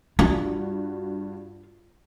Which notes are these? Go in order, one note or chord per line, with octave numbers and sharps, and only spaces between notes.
G2 F4 F#4